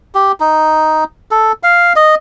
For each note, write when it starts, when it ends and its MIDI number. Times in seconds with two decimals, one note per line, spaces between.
0.15 0.32 67
0.40 1.04 63
1.31 1.52 69
1.63 1.93 77
1.96 2.15 75